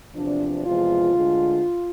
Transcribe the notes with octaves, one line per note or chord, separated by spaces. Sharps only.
E2 C3 F3 D4
E2 C3 F3 G#3 F4
D2 D3 G#3